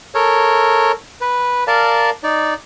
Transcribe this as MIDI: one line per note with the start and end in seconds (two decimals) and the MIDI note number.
0.14 0.92 69
0.14 0.92 70
0.14 0.92 73
1.21 1.64 71
1.67 2.10 70
1.67 2.10 74
1.67 2.10 77
1.67 2.10 81
2.23 2.54 63
2.23 2.54 74